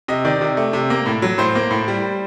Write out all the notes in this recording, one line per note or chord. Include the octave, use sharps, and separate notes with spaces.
C3 D#5
D#3 D5
C3
A3
C3
A#3
A2
F#3
A2 C5
A#3
A2
G3